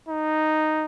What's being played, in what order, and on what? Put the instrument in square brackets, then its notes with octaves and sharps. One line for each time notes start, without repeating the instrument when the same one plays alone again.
[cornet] D#4